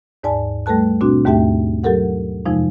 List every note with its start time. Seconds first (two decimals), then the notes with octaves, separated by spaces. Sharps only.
0.23 D#2 G#2 D5 G#5 A5
0.66 G3 A3 A4 B4 A5 F#6
1.01 B2 C4 D4 F#4
1.25 D#2 G#2 A3 G4 E5 G5
1.84 F#3 G4 A4 A#4 F#5
2.46 F2 C3 F3 G#3 D#4